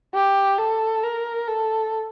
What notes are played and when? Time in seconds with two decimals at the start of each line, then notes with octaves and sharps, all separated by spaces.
0.14 G4
0.58 A4
1.03 A#4
1.48 A4